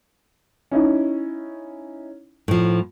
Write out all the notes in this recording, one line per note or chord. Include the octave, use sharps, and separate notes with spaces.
C#4 D#4 E4
A2 F3